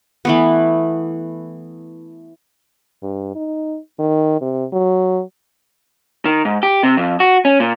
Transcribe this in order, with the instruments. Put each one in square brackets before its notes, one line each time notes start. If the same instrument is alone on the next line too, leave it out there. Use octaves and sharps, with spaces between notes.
[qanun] E3 A3 B3
[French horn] G2
D#4
D#3
C3
F#3
[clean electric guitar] D#3
G#2
G4
C3
F2
F#4
C#4
A#2